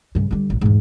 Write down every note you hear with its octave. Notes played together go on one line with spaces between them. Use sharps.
G2 C#3
D3 G3
A1
E2 G#2